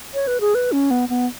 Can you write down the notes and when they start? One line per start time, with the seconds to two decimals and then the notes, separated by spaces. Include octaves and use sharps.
0.14 C#5
0.27 B4
0.40 G#4
0.55 B4
0.72 C#4
0.91 B3
1.09 B3